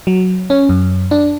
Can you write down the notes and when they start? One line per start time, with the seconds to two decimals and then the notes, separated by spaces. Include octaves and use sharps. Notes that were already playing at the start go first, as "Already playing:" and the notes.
0.07 F#3
0.50 C#4
0.69 F#2
1.11 D4